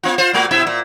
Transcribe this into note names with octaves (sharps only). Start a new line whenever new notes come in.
B3 F4
F4 C5
A#2 A3 F#4
B2 E4 E5
A#2